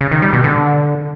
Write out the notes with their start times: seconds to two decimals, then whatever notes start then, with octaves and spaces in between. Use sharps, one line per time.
0.01 C#3
0.11 D#3
0.22 G3
0.33 B2
0.44 D3